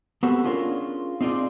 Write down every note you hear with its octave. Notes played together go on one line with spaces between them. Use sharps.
B3 C4 F#4 G4 A4
C#4 D4 F4 G#4 A#4 C#5
C4 D#4 F4 G#4 D5